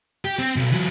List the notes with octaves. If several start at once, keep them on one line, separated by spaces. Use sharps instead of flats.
G4
C4
B1
E3 F#3